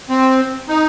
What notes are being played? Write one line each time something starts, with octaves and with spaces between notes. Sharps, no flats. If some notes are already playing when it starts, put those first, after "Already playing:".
C4
D#4